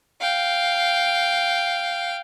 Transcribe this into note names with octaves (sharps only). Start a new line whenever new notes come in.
F5 G5